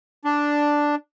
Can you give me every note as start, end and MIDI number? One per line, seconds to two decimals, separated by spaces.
0.25 0.95 62